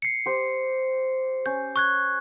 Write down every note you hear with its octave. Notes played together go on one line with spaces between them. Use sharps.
C7 C#7
G4 C5
C#4 G6
C#6 F#6 G#6